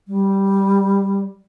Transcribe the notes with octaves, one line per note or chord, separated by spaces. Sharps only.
G3